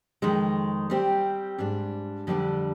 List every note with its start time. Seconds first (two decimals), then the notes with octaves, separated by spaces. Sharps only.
0.22 F2 D#3 G#3
0.90 G3 C4 G4
1.58 G#2 G3 D4
2.27 F2 D3 G3 D4